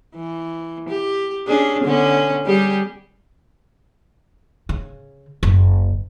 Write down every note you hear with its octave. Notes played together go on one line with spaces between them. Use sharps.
E3
G4
C#4 D4 G#4
D3 B3 C#4
G3 G4 G#4
C#3
F#1